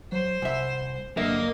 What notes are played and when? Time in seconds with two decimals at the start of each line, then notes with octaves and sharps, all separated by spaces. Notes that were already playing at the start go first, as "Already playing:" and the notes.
0.12 F#3 C5
0.42 C2 E5 F#5 G#5
1.17 G2 D3 F#3 A#3 D#5 E5